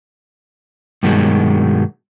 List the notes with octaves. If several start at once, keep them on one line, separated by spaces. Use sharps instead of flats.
G2 B2 D#3 F#3 G#3